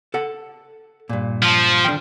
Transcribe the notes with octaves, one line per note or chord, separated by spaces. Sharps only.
A4 F#5
G2 A#2
F3
D3 G5